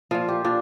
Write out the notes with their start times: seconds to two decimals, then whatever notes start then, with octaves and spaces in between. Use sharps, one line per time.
0.11 A#2 F3 F4
0.28 G4
0.45 A#2 D4